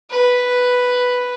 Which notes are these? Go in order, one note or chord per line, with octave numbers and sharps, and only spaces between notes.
B4